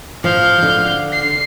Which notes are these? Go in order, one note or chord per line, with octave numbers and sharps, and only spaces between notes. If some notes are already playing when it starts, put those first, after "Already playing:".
F3 F5 G6
D3
C7